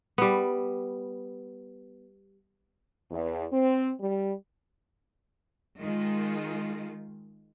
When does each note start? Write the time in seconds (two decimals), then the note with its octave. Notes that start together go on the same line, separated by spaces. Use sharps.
0.18 G3 B3
3.11 E2
3.53 C4
4.01 G3
5.79 D#3 G#3 F4